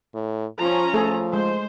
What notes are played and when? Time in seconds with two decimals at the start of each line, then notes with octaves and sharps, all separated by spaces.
0.14 A2
0.61 F3 C#4 F4 A#5
0.94 F3 A3 G#4 A4
1.33 G#3 C5